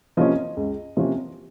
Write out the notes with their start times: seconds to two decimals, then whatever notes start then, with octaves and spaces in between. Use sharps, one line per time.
0.17 C3 F3 A#3 C#4 D#5
0.57 C#2
0.97 C3 F3 A#3 C#4